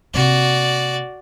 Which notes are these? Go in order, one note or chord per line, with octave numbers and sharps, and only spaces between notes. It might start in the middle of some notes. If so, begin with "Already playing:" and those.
C3 A#3 F#4 D5